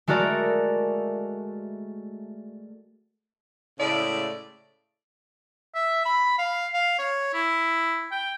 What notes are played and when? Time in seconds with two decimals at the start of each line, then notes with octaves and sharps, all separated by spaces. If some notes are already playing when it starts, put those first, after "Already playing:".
0.08 G#3 A3 F#4 A#4 D5
3.79 A2 C#3 G#3 A3 D5
5.75 E5
6.05 B5
6.38 F5
6.74 F5
6.99 C#5
7.34 E4
8.12 G5